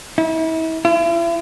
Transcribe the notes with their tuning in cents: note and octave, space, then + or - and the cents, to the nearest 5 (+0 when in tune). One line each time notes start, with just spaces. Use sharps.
E4 -40
E4 +40